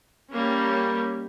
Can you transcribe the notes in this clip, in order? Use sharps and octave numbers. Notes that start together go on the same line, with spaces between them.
G3 A#3 C#4